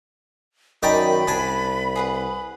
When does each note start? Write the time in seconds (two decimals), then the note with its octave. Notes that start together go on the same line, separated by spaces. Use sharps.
0.83 F#2 D#3 D5 D#5 G5 G#5 A#5 B5
1.27 C2 D4 G#5 A5
1.96 G#4 B4 F#5